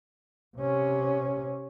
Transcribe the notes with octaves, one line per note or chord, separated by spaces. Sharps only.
C3 C#4